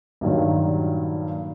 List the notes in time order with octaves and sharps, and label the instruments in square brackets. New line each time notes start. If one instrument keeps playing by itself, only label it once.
[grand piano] G2 A#2 D#3 F#3